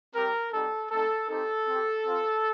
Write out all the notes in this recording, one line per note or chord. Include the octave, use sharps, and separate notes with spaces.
G3 C4 G4 A#4
G3 C4 D#4 G4 A4
A3 C4 D#4 A4
C4 D#4 G4 A4
C4 G4
C4 F4